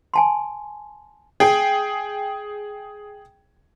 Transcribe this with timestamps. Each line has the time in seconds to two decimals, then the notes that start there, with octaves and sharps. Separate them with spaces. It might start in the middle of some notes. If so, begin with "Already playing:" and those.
0.14 G#5 A5 C6
1.40 G#4 G5